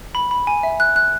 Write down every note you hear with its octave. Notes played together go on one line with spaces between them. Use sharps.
B5
B5
G#5
E5
F#6
F#6